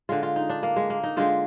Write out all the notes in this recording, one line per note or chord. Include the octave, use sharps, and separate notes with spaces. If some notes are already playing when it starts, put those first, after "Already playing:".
D3 G#3 F4
F4
D#4
D4
A#3
G#3
A#3
D#4
D3 G#3 F4